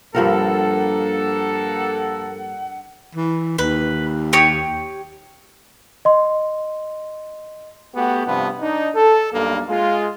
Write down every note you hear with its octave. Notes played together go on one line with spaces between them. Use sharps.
G2 F3 A#3 A4 A#4 F#5
E3
D#2 B4
G4 C#5 D#6
D#5 C6
A3 B3 F#4 G4
G2 C3 F3 B3
D4 D#4
A4
B1 G2 A#3
G#3 F4